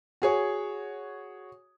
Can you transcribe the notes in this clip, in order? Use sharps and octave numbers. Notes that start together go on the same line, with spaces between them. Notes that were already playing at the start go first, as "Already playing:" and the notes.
F#4 G#4 C#5